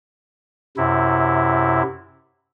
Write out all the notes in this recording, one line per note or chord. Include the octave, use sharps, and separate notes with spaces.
F#2 C3 E4